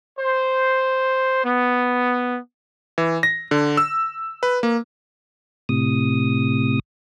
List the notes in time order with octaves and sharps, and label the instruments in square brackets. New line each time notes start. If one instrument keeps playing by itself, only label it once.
[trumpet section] C5
B3
[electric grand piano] E3
A#6
D3
E6
B4
A#3
[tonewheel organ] A2 C3 D#6